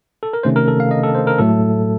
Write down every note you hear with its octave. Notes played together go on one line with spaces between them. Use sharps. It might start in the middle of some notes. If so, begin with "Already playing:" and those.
A4
A#4
C3 D#3 A3 C#4 C5
A#4
A4
F5
D#5
A4
C5
A#4
A2 F#3 A3 A4